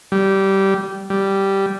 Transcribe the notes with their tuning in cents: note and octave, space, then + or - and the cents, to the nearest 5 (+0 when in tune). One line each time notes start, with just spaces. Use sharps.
G3 -15
G3 -5